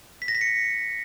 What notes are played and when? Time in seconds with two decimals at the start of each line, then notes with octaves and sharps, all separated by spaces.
0.22 B6
0.28 A#6
0.35 B6
0.41 C#7